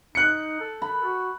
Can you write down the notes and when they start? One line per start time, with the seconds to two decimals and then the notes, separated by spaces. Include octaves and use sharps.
0.15 D#4 F#6 C#7
0.60 A4
0.82 B5
1.04 F#4